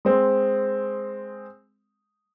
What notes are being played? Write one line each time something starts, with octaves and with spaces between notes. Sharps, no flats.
G#3 C4